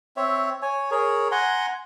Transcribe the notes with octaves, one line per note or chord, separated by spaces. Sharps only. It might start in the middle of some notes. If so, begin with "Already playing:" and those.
C4 C#5 E5
C#5 G#5
G#4 A#4 C#5
F#5 G#5 A#5 C6